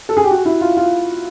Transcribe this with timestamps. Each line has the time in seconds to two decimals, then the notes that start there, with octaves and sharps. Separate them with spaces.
0.09 A4
0.17 G#4
0.24 G4
0.31 F#4
0.45 E4
0.61 F4
0.77 F4